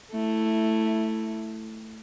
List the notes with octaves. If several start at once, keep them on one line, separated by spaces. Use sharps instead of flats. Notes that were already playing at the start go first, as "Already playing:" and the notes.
A3 E4